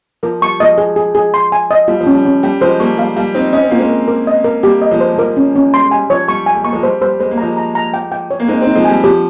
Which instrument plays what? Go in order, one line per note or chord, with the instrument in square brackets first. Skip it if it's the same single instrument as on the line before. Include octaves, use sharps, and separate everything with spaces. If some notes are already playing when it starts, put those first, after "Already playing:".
[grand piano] F3 [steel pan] A#4
[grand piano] G3 [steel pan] C#6
[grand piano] F3 G#3 [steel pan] D#5
[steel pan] G#4
G#4
G#4
C6
G#5
D#5
[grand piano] G3 [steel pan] F4
[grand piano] F3
[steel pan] C#4
[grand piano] G3
[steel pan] C#4
[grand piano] G3 [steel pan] G5
[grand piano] F3 G#3 [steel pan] C5
[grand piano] G3 A#3 [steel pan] C#6
[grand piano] G3 [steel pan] F5
[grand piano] G3 [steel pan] F5
[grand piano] C4 D#4 [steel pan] C#5
[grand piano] C#4 [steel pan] D#5
[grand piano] C4
[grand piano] A#3 [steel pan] F4
[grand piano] G#3 C4
[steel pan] A#4
A#4
D#5
A#4
[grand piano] G3 A#3 [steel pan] G4
[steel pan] D#5
[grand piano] F3 G#3
[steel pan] C5
[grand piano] G3
[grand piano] F3 [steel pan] A#4
[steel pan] C#4
C#4
[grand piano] G3 [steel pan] C6
[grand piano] G#3
[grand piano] G3 [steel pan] G#5
[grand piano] F3 [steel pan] C#5
[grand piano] G3 [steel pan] C#6
[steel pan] G#5
[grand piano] G#3
[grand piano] A#3 [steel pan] C#6
[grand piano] F3 G#3
[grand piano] G3 [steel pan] C5
[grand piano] G3 [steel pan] C5
[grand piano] G#3 [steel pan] C5
[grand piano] A#3
[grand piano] F3 G#3 [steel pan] A#5
[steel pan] A#5
A#5
G5
G5
C#5
[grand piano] A#3
[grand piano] G#3 C4 [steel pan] D#4
[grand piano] G#3 C4
[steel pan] D#4
[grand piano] F3 G#3
[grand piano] G3 [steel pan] G#5
[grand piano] F3 [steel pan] G4